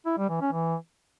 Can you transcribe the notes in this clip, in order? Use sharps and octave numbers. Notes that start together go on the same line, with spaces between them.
E4
G3
E3
C#4
E3